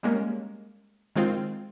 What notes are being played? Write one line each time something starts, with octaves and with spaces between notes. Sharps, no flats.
G3 G#3 A#3 C#4
D#3 G#3 C4 F4